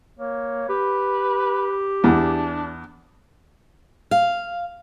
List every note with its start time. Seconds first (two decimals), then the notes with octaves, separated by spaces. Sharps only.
0.19 A#3 C#5
0.69 G4 B4
2.04 E2 D4
4.11 F5